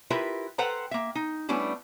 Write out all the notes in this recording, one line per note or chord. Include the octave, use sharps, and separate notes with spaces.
E4 F4 G4 A#4 B4 E5
A4 B4 C5 F#5 G5 A#5
A#3 E5
D#4
G3 A3 B3 C#4 D4 E4